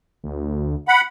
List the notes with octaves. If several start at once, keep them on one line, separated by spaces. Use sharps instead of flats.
D2
F#5 B5